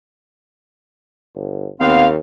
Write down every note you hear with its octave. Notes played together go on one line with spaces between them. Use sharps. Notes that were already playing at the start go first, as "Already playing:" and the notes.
G1
D#2 B3 C4 F5